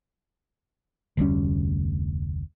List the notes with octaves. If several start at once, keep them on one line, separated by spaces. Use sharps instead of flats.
F1 D2 G3 C#4